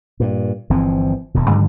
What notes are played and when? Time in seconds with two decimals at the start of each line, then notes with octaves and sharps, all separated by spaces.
0.20 G2 A#2
0.70 G1 E3 F3 C4
1.34 D#1 D2 B2
1.50 G2 D3 D#3 F#3